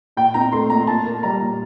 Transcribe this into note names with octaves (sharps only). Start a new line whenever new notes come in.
A#2 G5
C4 A#5
A3 C6
A#2 A#5
A#2 A5
A#3
G3 A#5
A#2